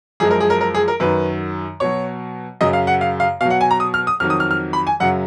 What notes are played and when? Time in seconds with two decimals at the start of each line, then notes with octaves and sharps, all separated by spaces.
0.20 F#2 F3 G#3 G#4
0.31 A#4
0.40 G#4
0.50 A#4
0.61 A#4
0.75 G#4
0.88 A#4
1.00 F#2 D#3 F#3 B4
1.80 B2 F#3 C#5
2.61 F#2 C#3 F#3 D#5
2.73 F5
2.87 F#5
3.01 F5
3.20 F5
3.40 B2 F5
3.45 F#3
3.50 F#5
3.61 G#5
3.71 A#5
3.80 D#6
3.94 F6
4.07 D#6
4.20 F2 D#3 F#3 F6
4.30 D#6
4.40 F6
4.51 F6
4.73 B5
4.87 G#5
5.00 F#2 C#3 F#3 F#5